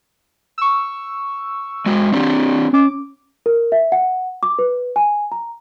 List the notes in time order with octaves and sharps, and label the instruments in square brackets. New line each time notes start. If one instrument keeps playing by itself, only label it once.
[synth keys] C#6 E6
[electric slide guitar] G#3 F#4
C4 D4 G4
[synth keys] C#4 D6
[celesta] A#4
E5
F#5
D6
B4
G#5
A#5